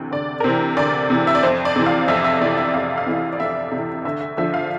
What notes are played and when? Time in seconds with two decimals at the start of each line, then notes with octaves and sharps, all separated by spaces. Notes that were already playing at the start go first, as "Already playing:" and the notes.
Already playing: D2 C3 E3
0.11 D2 D5
0.40 A#4
0.44 C3 E3 C5
0.77 D2 D5
1.10 C3 E3
1.27 E5
1.35 D5
1.43 F2 C5
1.65 D5
1.76 C3 E3
1.86 F5
2.08 F2 E5
2.24 E5
2.41 C3 E3 D5
2.57 E5
2.74 F2 F5
2.98 F5
3.06 C3 E3
3.33 D5
3.40 F2 E5
3.71 C3
3.77 E3
4.05 D2 E5
4.21 E5
4.37 D3 F3 E5
4.54 F5